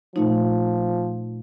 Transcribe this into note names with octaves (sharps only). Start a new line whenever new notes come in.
A#2 F3 A3 D#4